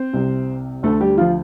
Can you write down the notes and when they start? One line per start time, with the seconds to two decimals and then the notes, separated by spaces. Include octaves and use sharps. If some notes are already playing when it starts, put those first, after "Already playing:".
Already playing: C4 C5
0.13 C2 C3
0.83 D2 D3 A3 A4
1.00 G3 G4
1.18 F3 F4